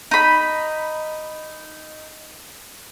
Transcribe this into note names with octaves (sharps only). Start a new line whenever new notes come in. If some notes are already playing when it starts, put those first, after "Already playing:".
D#4 B5